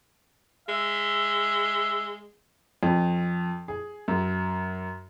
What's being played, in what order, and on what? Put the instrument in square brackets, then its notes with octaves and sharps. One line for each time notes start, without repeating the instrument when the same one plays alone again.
[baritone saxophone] G#3 [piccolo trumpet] E5
[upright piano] F2
G#4
F#2